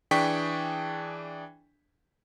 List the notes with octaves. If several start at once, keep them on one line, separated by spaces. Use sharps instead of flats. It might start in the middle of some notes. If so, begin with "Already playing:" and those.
E3 D4 G#4 G5 C#6 B6